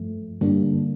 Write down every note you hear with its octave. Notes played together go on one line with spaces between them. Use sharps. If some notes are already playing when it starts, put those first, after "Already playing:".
Already playing: G2 F3 A3
G2 D3 G3 A#3 D4